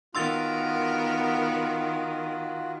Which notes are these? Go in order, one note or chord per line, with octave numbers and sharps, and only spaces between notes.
D#3 B3 F4 F#4 A#4 C6 E6 A6